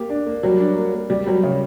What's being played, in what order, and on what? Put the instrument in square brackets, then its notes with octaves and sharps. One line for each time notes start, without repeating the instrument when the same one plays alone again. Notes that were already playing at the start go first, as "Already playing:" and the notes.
Already playing: [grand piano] A#3 G4
D4
A#3
[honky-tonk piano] F#3 [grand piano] G3
[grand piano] D4
A#3
A#3
[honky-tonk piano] G3 [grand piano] G4
[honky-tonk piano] F#3 [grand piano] G3
[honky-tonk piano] C#3 [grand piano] G3